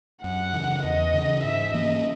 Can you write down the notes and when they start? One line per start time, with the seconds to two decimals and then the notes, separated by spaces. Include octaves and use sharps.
0.23 F#2 F#5
0.53 C#3 E3
0.83 E2 D#5
1.13 C#3 E3
1.43 G#2 E5
1.74 E3 A#3 C#4 D#5